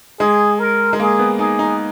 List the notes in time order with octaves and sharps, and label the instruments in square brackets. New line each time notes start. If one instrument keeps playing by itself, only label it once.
[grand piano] G#3 [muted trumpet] G#4
[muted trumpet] A#4
[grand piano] G#3
[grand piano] A#3 [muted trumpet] G#4
[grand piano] B3
[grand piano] D#4 [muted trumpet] G#4
[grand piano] D#4